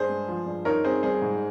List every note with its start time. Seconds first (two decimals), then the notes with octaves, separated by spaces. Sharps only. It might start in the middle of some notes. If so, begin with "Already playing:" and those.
Already playing: G2 G#4 C5
0.09 G#3
0.28 F3
0.46 G2
0.65 D#4 A#4 C#5
0.84 C4 G#4 C5
1.03 G3 G#4 C5
1.22 G#2